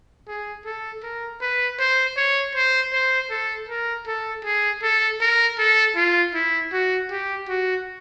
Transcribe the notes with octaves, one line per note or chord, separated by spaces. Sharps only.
G#4
A4
A#4
B4
C5
C#5
C5
C5
A4
A#4
A4
G#4
A4
A#4
A4
F4
E4
F#4
G4
F#4